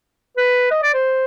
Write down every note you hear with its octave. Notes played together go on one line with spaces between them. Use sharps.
B4
D#5
D5
C5